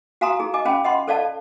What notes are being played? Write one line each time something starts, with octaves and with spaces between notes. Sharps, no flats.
F#4 F5 G#5 A#5 C6 D#6
D#4 G#4
D#5 G#5 D6
C#4 C5 F5 G5 B5
D#5 F#5 B5 C6
A4 C5 D5 D#5 F5 A5